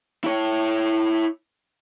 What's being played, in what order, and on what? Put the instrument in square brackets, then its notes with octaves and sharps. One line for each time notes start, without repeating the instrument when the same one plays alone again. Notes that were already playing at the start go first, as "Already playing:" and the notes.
[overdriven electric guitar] E4 C#5